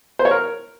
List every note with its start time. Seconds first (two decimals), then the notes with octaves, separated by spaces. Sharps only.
0.19 C5
0.25 C#5
0.31 A#4